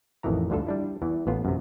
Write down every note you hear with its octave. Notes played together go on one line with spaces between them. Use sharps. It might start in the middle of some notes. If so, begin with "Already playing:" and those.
A1 F2 D#3 E3 A#5
D2 G2 D3 F4 A4
G3 D4 E4
E2 E3
A1 B3 F4
F#2 C3